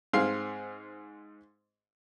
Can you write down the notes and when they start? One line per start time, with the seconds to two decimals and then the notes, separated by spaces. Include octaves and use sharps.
0.13 G#2 C4 G#4 F5 C6